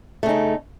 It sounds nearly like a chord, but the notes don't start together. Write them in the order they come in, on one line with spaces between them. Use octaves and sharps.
A3 C#3 D#4